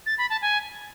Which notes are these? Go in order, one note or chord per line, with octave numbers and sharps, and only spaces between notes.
A6
B5
A5
G#5